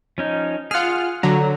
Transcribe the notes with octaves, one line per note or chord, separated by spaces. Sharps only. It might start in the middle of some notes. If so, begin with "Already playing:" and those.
F3 C#4 D#4
F4 G#4 F#5 F6
D3 F#3 A#5